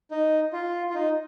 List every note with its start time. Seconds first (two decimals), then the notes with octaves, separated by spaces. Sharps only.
0.11 D#4
0.53 F4
0.90 F4
0.95 D#4